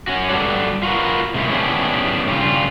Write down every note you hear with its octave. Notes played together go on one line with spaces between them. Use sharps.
C#4 F#4
G2 G3 F#4 A4 D5
F4 F#4 A#4 B4
C3 G#3 A#3 C#4 E4
B3 C#4 D4 E4 G4 G#4
G2 C#3 G3 F4